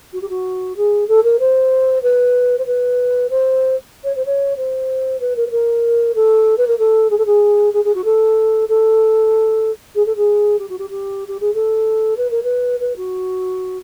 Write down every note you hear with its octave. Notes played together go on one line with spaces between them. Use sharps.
F#4
G4
F#4
G#4
A4
A#4
C5
B4
C5
B4
C5
C#5
C5
C#5
C5
B4
A#4
B4
A#4
A4
B4
A#4
A4
G#4
A4
G#4
G#4
G#4
F#4
A4
A4
G#4
A4
G#4
G4
F#4
G4
G4
G4
G#4
A4
B4
A#4
B4
B4
F#4